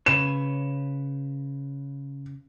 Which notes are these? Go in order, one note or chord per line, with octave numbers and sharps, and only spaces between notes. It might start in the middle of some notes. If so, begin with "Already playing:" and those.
C#3 B4 C#5 E7